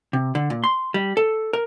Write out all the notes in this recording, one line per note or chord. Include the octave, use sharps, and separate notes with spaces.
C3
D3
A#2
C6
G3
A4
A#4